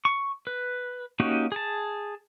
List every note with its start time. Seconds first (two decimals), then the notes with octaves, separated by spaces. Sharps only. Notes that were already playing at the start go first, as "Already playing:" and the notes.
0.05 C#6
0.47 B4
1.20 A#3 C#4 D#4 F#4 G4
1.52 G#4 A5